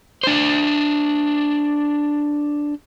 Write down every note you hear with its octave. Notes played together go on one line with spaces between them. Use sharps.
D4 C5